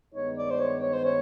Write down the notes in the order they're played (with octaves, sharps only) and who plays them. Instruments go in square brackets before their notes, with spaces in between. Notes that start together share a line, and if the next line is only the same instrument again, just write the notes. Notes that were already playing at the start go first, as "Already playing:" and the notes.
[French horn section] G2 D#3 G#3 B3 D#4 [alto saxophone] C#5
[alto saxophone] D5
C5
C#5
C#5
C5
C#5